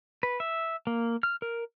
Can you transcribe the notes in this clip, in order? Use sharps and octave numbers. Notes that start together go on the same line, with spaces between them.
B4
E5
A#3
F6
A#4